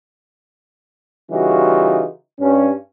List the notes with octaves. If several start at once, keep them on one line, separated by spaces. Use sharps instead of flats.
C#3 E3 G3 D#4 F4 F#4
G2 C#4